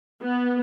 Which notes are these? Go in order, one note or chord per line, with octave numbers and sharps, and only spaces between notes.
B3